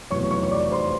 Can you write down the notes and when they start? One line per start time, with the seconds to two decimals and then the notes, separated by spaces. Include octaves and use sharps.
0.10 F1 E2 B2 F#3 C#5 C#6
0.31 C#5 C#6
0.43 C#6
0.51 D5 D6
0.72 C5 C6